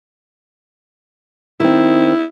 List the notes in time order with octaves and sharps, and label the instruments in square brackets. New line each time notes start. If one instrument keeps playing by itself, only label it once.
[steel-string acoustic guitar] D#3 C4 [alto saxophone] E4